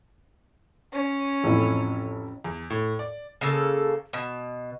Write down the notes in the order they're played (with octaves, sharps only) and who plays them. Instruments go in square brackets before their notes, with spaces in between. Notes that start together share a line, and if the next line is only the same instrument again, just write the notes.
[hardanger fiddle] C#4
[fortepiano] A1 F2 E4
[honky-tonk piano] E2
A2
D5
[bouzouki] C#3 A#3 A4
B2